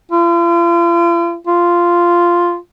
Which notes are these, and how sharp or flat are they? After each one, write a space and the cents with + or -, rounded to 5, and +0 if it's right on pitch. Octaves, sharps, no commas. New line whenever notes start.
F4 -45
F4 -5